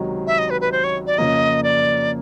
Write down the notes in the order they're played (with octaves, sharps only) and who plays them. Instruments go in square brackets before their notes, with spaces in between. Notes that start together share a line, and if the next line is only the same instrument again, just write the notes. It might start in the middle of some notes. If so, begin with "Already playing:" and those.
Already playing: [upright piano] C#2 C3 D#3 F#3
[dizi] E5
D#5
B4
B4
C5
C#5
D5
[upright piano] F2 C#3 F3 A#3 [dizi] D#5
[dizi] D5